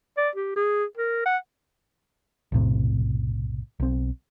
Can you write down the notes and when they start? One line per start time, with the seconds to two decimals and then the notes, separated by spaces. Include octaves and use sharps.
0.17 D5
0.36 G4
0.56 G#4
0.97 A#4
1.26 F#5
2.52 B1 F2 A2 C3
3.80 B1 C4